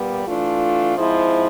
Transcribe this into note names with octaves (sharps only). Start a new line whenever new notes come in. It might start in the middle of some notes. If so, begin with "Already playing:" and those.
Already playing: A#2 G3 B3
E3 A3 D4 F4
G#2 F3 G#3 C4 E4